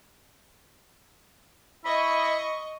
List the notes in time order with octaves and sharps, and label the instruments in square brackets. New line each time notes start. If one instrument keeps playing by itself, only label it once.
[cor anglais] E4 [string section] D#5 C#6 [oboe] B5